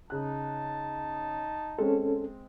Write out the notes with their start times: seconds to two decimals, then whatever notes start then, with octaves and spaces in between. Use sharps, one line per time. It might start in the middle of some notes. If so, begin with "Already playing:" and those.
0.10 C#3 D#4 A5 F#6
1.79 G#3 C4 C#4 A4